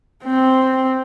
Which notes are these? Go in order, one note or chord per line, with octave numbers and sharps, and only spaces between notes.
C4